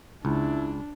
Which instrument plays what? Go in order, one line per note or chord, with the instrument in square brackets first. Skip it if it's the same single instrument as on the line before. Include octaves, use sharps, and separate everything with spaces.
[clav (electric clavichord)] C#2 [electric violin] D4 [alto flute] E4